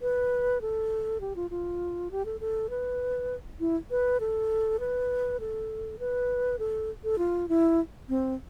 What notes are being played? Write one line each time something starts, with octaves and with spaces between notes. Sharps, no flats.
B4
A4
G4
F4
F4
G4
A4
A4
B4
E4
B4
A4
B4
A4
B4
A4
A4
F4
E4
C4